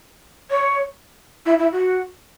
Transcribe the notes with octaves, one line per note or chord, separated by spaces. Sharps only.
C#5
E4
E4
F#4